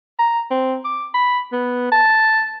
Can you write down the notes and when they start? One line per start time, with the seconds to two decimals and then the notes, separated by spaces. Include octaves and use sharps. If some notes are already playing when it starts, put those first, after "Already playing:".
0.19 A#5
0.51 C4
0.85 D6
1.14 B5
1.52 B3
1.92 A5